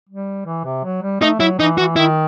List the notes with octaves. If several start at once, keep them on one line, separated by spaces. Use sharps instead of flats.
G3
E3
C3
F#3
G3
A3 D#4
F#3 E4
E3 D#4
E3 F#4
D#3 E4